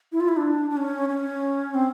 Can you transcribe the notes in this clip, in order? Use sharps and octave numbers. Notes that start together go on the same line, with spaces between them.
E4
F4
E4
D4
D4
C#4
C#4
C4